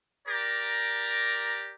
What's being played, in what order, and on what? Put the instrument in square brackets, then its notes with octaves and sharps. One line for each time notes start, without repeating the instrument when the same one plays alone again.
[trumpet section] G4 A#4 D5 A#5